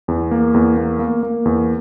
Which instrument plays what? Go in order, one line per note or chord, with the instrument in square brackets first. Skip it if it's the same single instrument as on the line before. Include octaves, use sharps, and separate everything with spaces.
[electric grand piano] E2
A#3
E2
A#3
A#3
A#3
E2